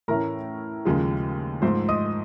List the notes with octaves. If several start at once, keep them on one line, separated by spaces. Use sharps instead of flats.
A2 E3 A3 C#4 A#4 A#5
D#2 C#3 F3 G#3
G#2 F3 A3 C5 C6
D#5 D#6